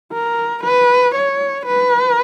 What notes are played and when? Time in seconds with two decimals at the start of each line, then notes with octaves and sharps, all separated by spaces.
0.13 A#4
0.64 B4
1.15 C#5
1.66 B4